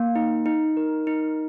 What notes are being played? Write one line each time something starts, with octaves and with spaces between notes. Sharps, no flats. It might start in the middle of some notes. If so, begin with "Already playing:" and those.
Already playing: A#3
D#4
D#4
A#4
D#4